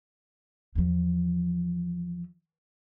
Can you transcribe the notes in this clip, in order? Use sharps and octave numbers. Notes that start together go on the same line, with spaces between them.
E2 F3